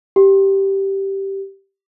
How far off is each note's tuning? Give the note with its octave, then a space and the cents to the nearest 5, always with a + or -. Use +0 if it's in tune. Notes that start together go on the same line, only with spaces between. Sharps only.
G4 -10